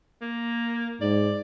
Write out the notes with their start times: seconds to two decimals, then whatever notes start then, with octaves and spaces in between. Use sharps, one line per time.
0.21 A#3
1.01 G#2 D5